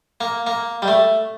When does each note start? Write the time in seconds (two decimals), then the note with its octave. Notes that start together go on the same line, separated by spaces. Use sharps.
0.21 A#3
0.47 A#3
0.82 G3
0.88 A3